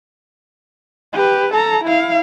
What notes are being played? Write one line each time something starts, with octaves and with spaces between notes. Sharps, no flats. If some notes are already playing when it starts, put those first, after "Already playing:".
G4 B4
A4 A#5
E4 F5